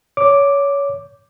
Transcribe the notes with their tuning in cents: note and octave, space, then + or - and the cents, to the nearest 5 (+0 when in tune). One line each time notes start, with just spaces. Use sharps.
C#5 +20 D6 +0